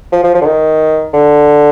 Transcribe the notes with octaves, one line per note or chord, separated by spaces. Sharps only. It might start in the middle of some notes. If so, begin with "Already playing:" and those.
F3
F3
F3
D3
D#3
D3